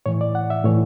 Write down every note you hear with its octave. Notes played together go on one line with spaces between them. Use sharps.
A2 E3 C#5
D5
F#5
E5
A2 E3 C#5